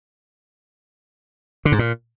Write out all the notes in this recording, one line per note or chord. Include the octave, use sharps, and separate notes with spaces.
D3
G#2
A#2